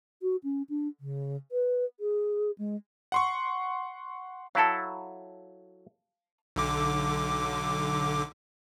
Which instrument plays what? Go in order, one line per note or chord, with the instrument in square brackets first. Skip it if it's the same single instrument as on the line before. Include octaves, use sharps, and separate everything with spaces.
[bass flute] F#4
C#4
D4
C#3
B4
G#4
G#3
[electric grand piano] F#5 C6 C#6
[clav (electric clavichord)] F#3 E4 A4 [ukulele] F5 A5
[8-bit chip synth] B1 D3 D6